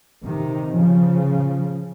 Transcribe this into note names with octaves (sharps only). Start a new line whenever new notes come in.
C3 D#3
C#3 F3